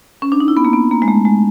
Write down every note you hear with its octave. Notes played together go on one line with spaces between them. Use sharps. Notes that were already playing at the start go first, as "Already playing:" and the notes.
C#4
D4
D#4
E4
B3
A#3
B3
A#3
G#3
A3
G#3